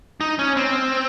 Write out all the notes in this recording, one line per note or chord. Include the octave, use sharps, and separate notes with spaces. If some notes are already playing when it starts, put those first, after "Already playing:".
D#4
C#4
C4